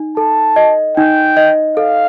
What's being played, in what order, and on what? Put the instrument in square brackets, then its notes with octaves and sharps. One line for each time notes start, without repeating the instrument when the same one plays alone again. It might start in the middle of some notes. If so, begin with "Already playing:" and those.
Already playing: [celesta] D#4
[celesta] A4 [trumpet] A5
[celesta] D#5
[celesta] D#4 [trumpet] G5
[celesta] D#5
[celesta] A4 [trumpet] F5